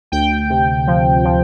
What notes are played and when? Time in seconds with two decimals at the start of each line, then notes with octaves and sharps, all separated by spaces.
0.12 D2 G5
0.50 C3
0.87 F3
1.25 F3